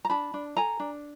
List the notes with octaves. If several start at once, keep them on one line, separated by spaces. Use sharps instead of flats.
A#5
D4 A5 B5
D4
A4 G#5 A#5
D4